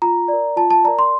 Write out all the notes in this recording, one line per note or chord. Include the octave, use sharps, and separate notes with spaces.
F4 A#5
A#4 D5
F4 A5
A5
A#4 D5 A#5
C6